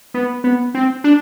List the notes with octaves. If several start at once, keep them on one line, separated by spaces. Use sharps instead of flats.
B3
B3
C4
D4